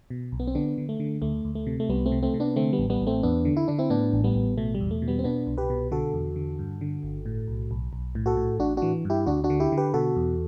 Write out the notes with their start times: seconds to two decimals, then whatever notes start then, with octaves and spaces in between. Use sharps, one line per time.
0.10 B2
0.32 B1
0.40 B3
0.47 C4
0.55 D3 B3 D4
0.78 D3
0.89 A3
1.00 D3
1.22 D2 A3
1.45 D2
1.55 A3
1.67 C3
1.80 A3
1.89 C2 G3 B3
2.06 A3 C4
2.12 C3
2.22 A3 C4
2.34 C3
2.40 B3 D4
2.56 D3 A3 C4
2.73 G3 B3
2.79 A1
2.90 G3 B3
3.01 A1
3.07 A3 C4
3.23 E2 B3 D4
3.45 D3
3.57 E4
3.68 D3 D4
3.78 C4 E4
3.90 A2 B3 D4
4.13 A1
4.24 G3 B3
4.35 A1
4.57 B2 A3
4.75 G3
4.81 E2
4.91 A3
5.02 B2
5.08 G3 B3
5.19 C4
5.24 B2 B3 D4
5.47 C2
5.58 G4 B4
5.70 B2
5.91 D3 F#4 A4
6.14 E2
6.36 D3
6.59 G2
6.81 D3
7.03 G1
7.26 A2
7.48 B1
7.71 B1
7.93 B1
8.15 A2
8.26 F#4 A4
8.37 A2
8.59 A1 D4 F#4
8.77 E3 D4 F#4
9.05 G2 E4 G4
9.26 D2 D4 F#4
9.44 D4 F#4
9.50 D3
9.60 E4 G4
9.72 D3
9.77 G4 B4
9.94 B2 F#4 A4
10.16 E2